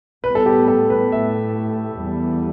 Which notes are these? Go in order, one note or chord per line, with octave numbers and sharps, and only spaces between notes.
A2 G3 B3 B4
A4
G4
A4
B4
A2 A3 E5
E2 E3 G3 B3